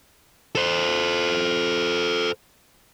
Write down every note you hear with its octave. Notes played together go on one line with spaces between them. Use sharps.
A4 C5